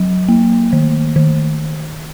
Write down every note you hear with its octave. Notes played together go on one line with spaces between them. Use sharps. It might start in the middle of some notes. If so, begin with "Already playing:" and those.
Already playing: F#3
A#3
D#3
D#3